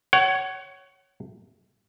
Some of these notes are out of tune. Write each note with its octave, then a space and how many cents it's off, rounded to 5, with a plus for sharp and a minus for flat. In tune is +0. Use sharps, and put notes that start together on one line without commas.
C#5 +0 F#5 +35